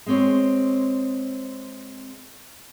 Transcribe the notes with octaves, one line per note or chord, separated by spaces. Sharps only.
G#3 C4 C#5